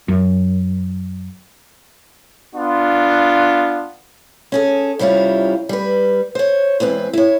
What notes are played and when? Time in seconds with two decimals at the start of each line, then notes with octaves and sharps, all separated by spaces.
0.08 F#2
2.55 B3 D4 F4
4.52 C#4 G#4 A4
4.99 C3 G3 C#4 E4 F4
5.69 G3 B4
6.35 C5 C#5
6.80 E2 G#2 C4 B4
7.13 E4 C#5